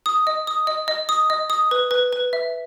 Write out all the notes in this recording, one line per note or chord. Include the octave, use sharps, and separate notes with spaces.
D#6
D#5
D#6
D#5
D#5
D#6
D#5
D#6
B4
B4
B4
E5